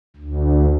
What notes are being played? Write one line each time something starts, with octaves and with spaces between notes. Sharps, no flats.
D2